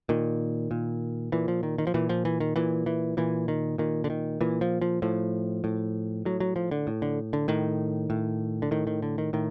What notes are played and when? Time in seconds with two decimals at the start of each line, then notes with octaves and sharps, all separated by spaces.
0.09 A#2 D#3
0.71 A#2
1.32 A#2 E3
1.48 F3
1.63 D#3
1.78 D#3
1.87 F3
1.94 A#2 E3
2.09 F3
2.25 E3
2.40 D#3
2.56 A#2 E3
2.86 E3
3.17 A#2 E3
3.48 D#3
3.78 A#2 D#3
4.04 D3
4.10 D#3
4.41 A#2 E3
4.61 F3
4.82 F3
5.02 A2 F3
5.64 A2
6.25 A2 F#3
6.40 F#3
6.56 F3
6.71 D3
6.87 A2
7.02 D3
7.33 D3
7.48 A2 D#3
8.10 A2
8.62 D3
8.71 A2 D#3
8.87 D#3
9.02 D3
9.18 D#3
9.33 A2 D#3